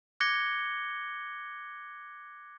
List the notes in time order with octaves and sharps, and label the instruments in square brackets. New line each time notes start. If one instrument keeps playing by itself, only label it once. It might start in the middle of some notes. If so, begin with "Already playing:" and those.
[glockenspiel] D6 F#6 G#6 A#6 C#7 G7